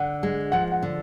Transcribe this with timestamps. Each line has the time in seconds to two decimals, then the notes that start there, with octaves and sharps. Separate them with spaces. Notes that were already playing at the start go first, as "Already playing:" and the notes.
Already playing: D3 F#5
0.23 G#3
0.52 F3 F#5
0.72 F#5
0.83 D3